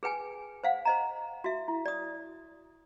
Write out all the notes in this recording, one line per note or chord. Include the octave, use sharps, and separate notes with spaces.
G#4 B4 G5 G#5
C5 F5 F#5
C5 D#5 A#5
F#4 E5
E4
D5 D#6